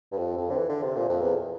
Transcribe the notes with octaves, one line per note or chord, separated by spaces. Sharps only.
G2
F2
F2
D3
E3
D3
C3
A#2
F2
E2